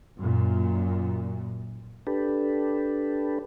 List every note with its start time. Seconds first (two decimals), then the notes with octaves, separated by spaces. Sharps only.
0.18 F#2 A#2
2.07 D4 G4 A4 B4